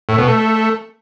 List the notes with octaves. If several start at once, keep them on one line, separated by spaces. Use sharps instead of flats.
A2
B2
A3